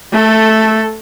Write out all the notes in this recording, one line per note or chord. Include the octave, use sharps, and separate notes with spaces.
A3 A4